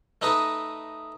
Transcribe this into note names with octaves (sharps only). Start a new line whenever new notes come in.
A3 D#4 B4 D#5